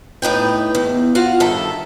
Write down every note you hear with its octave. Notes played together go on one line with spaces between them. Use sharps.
A2 D#4 B4 G5
E2
F4 F#4 F5 F#5
G2 D#3 A4 E5